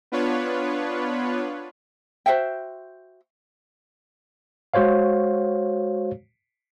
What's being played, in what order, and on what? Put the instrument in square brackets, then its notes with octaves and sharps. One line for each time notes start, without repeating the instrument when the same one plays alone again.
[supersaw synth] B3 D4 F4 B4 C#5
[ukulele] F#4 C5 E5 G5
[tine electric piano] G#3 F#4 C5 C#5 F5